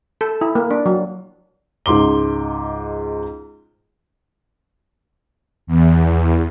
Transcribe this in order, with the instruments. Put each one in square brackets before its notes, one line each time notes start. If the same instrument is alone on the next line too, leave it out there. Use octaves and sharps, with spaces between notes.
[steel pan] A4
E4
A#3
D4
F#3
[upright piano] C#2 G#2 C6 D6 G7
[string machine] E2